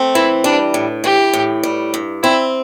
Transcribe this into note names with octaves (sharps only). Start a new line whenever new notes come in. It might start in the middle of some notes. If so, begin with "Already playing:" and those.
Already playing: A3 C4
E3 E4
G3 D4
A2
E3 G4
A2
G3
G2
C4 E4